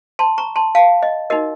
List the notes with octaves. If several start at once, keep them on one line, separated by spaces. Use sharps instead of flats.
A5 C6
A#5 C#6
A5 C6
F5 A5
D#5
D#4 F#4 A#4 D#5